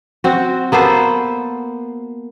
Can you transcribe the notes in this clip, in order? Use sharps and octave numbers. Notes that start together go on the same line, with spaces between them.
C4 F#4
A#3 B3 A4 C5